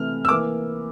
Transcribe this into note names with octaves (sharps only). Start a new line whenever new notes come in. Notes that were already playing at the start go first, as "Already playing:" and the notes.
Already playing: C3 E3 A3 F6
E6
E3 A#3 D6